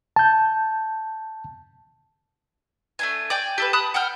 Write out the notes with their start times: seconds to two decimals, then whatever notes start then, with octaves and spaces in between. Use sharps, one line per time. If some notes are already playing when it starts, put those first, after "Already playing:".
0.16 A5 G6
2.99 A3 D4 G#5
3.30 D5 G5 G#5
3.58 G4 A4 B4
3.73 A5 B5 D#6 F#6
3.94 F#5 G5 F6